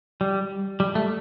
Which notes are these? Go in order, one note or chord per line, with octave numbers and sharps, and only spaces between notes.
G3
G3
A3